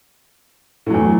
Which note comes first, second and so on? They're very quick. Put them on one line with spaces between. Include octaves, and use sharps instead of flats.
A2 F#3 E2